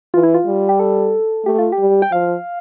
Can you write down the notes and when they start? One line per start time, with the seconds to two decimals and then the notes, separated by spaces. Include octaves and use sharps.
0.14 E3 F4
0.23 E4
0.34 F4
0.46 G3
0.69 G4
0.80 A4
1.45 A3 G4
1.59 F4
1.72 G4
1.78 G3
2.02 G5
2.11 F3 F5